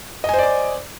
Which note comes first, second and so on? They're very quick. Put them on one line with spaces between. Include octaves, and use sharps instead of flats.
D#5 G#5 C5 D5 D6